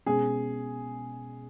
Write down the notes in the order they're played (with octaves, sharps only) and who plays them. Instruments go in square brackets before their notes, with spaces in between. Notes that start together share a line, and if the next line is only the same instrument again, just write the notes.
[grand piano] B2 G#3 C#4 [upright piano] G#4